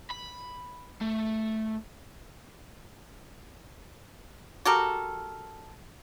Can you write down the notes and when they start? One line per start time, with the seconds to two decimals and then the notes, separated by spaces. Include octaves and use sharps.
0.10 B5
1.01 A3
4.65 F#4 G4 A4 A#4